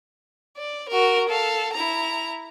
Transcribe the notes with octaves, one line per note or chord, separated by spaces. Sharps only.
D5
F#4 A#4
A4 F5
E4 A#5